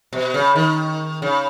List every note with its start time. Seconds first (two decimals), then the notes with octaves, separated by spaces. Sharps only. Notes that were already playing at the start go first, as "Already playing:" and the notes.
0.13 B2
0.34 C#3
0.55 D#3
1.22 C#3